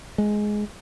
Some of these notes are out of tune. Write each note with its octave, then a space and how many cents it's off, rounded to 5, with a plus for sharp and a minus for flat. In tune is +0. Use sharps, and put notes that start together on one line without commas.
G#3 +10